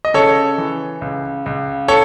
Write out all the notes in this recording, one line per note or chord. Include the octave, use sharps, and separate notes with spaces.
D#5
C#3 A4 C#5
E3
C#2
C#2
A4 C#5